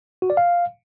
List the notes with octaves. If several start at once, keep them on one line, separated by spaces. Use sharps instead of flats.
F#4
D5
F5